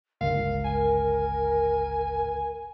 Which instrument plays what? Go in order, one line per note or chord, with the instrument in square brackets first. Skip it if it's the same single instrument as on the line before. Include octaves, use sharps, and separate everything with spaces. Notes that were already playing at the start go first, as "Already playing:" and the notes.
[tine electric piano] G1 C#2 [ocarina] A#4 [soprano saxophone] F5
[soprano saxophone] G#5